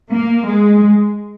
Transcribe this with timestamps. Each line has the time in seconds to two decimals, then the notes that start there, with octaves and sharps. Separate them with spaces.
0.11 A#3
0.45 G#3